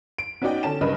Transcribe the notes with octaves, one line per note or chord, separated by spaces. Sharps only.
D7
B3 C#4 D#4 F#4 D5 G5
D3 C#4 A5 E7
G2 C#3 A#4 B4 D#5 B5